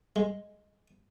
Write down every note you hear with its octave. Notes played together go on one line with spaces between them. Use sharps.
G#3